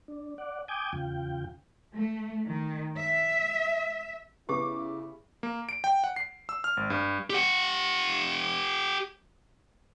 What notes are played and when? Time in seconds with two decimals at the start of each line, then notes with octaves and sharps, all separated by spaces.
0.08 D4
0.38 D5 F#5
0.68 G5 G#5 D6 D#6 G6 G#6
0.93 E2 C#3 F4 G5
1.93 A3
2.45 D#3
2.98 E5
4.49 C#3 B3 E4 G4 D6
5.43 A#3
5.69 D7
5.84 G5
6.04 F#5
6.16 C7
6.49 E6
6.64 F6
6.77 G#1
6.90 G2
7.30 G4 F#5